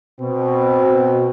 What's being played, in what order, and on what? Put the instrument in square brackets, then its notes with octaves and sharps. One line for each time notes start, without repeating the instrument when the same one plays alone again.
[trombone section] B2 [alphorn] C4